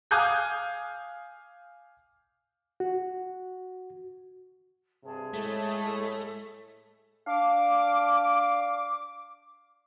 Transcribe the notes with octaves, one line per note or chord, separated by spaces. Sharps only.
F5 G#5 D6 D#6 F#6 G6
F#4
G2 C3 G#4 A5
A2 G#3 A3
D4 F5 D6